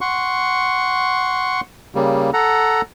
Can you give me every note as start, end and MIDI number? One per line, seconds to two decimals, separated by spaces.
0.01 1.61 78
0.01 1.61 84
0.01 1.61 85
1.95 2.30 49
1.95 2.30 55
1.95 2.30 58
2.33 2.81 69
2.33 2.81 78
2.33 2.81 82